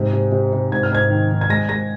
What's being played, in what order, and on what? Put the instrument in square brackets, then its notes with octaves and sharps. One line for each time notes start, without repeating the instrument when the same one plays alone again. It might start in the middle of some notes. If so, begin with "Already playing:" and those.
Already playing: [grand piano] G#2 C3
C3
C3
C3
G#2 G#6
F6
G#2 G#6
D#3
D#3
G#6
G#3 A#6
G#3 A#6